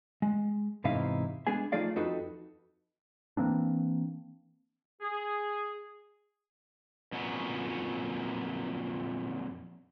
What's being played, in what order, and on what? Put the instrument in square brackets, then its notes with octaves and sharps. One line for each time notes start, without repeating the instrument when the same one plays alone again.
[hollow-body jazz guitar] G#3
E2 G#2 C3 D#4 E4 F5
G#3 B3 D4 G#4 G#5
F3 A3 D#4 G#4 D5 F5
F2 D#4 F#4 A4 B4
[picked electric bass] E3 A#3 C4 D4
[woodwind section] G#4
[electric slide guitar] F2 A#2 F#3 B3 C#4